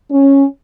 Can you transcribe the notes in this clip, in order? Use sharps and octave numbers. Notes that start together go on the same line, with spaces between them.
C#4